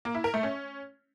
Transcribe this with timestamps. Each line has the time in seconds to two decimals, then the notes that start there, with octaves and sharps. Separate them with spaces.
0.05 A#3
0.15 E4
0.24 A#4
0.34 A3
0.43 C#4